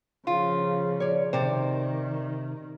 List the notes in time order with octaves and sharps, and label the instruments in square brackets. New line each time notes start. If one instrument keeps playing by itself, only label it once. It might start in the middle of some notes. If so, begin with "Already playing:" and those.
[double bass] C#3 F3 [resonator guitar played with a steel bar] F4
[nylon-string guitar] C#5 D5
[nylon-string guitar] C3 [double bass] D#3 [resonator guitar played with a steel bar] C5 D5